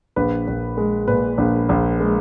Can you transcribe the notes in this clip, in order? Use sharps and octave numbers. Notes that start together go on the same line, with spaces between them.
A#1 B4
A#1
G#3
A#2 B4
A#1
A#1
G#3